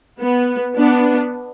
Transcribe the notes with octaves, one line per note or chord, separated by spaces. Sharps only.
B3
B3 D4